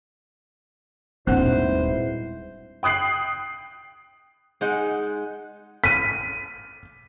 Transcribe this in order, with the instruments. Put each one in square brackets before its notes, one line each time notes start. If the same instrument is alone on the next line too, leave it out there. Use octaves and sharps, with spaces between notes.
[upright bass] D#1 [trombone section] G#2 B2 E4 [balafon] C4 D4 F#5 [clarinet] C5
[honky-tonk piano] G5 D#6 F#6 C7 F#7
[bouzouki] G#3 D#4 F#5
[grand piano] B6 D#7